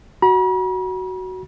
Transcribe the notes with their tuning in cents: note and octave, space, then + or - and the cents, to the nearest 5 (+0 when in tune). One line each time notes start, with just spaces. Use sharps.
F#4 +10 B5 -45